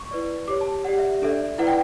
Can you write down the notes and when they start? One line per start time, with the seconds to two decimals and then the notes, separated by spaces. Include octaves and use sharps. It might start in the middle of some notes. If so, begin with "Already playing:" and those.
Already playing: C#6
0.11 E4 B4 D5
0.48 G4 C#5 D6
0.61 A5
0.84 G4 D5 F#5
0.99 E5
1.22 D4 A4 D5 E5
1.58 E4 B4 D5 F#5
1.67 G5